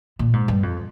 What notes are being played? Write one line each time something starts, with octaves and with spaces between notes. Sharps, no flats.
A#2
G#2
G2
F2